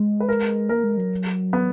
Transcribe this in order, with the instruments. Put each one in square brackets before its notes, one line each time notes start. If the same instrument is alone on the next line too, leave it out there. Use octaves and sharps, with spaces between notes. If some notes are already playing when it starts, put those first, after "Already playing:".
Already playing: [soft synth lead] G#3
[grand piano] B4
A#4
[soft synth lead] A#3 [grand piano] A#4
[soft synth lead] G#3
F#3
[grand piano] B3